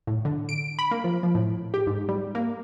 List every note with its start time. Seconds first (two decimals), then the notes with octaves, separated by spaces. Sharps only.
0.07 A2
0.25 D3
0.49 D7
0.79 B5
0.91 A#3
1.04 F3
1.23 F3
1.35 A2
1.74 G4
1.87 G#2
2.09 G3
2.35 A#3